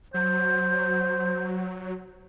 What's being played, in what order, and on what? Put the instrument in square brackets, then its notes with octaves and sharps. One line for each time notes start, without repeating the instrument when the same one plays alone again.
[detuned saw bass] F#3 [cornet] C5 [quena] G6